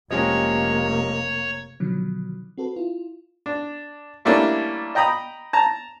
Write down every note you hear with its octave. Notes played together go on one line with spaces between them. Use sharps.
F1 F3 G#3 A#3 C#4 G4 C#5 D#5
B2 D3 D#3 F3 F#3
C4 F#4 A4 B4
E4 F4
D4
G3 A3 A#3 C#4 D4 E4
D#5 G5 A#5 B5 D#6
A5 A#5